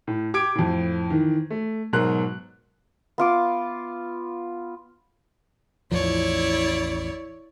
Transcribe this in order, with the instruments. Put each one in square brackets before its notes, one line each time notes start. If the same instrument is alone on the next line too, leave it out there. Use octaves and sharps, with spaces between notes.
[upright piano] A2
G4 D6 G#6 D7
F2 A2
D#3 E3
A3
G#2 B2 F#3 A#4 C6 F#6
[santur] B3 F4 D6
[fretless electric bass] A1 E2 F3 [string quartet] E4 C#5 D5